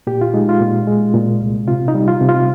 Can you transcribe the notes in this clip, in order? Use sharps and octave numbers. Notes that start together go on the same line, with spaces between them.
A#2 G4
F4
G#3 D#4
F4
A#2
G#3
A#2
C2
C3 F4
D#4
G3
F4
C3
F4